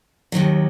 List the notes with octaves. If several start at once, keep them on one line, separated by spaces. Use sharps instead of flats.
D#2 D#3 F#3